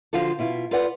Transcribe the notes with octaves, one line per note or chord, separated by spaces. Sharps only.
D3 F3 F4 F#4 A4
B2 E4 F4
F4 A4 B4 D5 F#5